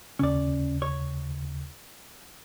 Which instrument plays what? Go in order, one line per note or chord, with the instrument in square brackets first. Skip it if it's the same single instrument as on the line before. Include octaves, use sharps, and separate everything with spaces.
[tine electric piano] D#2 C#3 [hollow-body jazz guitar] C#4 D5
[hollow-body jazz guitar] C#5